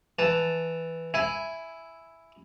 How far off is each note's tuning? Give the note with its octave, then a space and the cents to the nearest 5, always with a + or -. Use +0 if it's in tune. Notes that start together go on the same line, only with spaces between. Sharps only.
E3 +0 A5 +0
E4 +0 E5 +0 G#5 +0